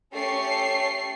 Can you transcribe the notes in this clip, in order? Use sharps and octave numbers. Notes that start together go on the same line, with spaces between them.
A3 C#4 G4 A4 C#6 C7